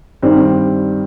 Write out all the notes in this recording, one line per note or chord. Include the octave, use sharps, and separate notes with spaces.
G2 D#3 G3 C4